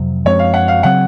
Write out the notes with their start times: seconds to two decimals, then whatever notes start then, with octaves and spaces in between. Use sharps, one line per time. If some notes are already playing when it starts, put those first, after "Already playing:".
Already playing: F2 C3 F#3
0.25 F#2 F3 G#3 C4 C#5
0.39 F5
0.54 F#5
0.68 F5
0.83 C#3 F#3 C4 F#5